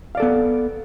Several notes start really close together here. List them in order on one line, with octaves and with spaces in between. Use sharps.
F5 D5 A4 B3